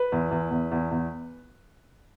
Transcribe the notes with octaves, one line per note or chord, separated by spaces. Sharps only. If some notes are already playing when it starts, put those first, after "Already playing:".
Already playing: B4
E2
E2
E2
E2
E2